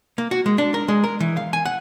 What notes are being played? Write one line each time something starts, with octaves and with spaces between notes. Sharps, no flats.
A#3
F#4
G#3
D4
A#4
G#3
A#4
E3
F5
G#5
F#5